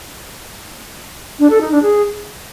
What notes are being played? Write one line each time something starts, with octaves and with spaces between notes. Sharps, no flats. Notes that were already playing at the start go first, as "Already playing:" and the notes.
D4
A4
D#4
D4
G#4